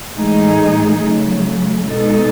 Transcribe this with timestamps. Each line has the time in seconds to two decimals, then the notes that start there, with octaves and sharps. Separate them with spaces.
0.14 A2 E3 G#3 D#4 G#4
1.02 C#3 F#3 A3
1.89 B2 G#3 D#4 A4